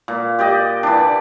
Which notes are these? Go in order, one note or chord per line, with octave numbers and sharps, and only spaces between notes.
A#2
G4 D5 D#5
E3 D4